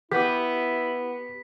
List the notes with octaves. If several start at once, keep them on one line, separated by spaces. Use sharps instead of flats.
B3 E4 G4 B6